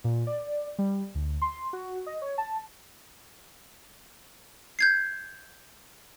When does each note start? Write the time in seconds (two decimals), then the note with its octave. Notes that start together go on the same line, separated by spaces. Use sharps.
0.04 A#2
0.27 D5
0.79 G3
1.15 D2
1.42 C6
1.73 F#4
2.06 D#5
2.22 C#5
2.38 A5
4.79 G6 G#6 C7